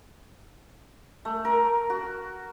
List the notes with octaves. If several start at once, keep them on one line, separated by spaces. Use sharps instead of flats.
A3
A#4
F#4